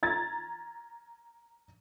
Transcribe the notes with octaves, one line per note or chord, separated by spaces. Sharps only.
A#5 G#6 A6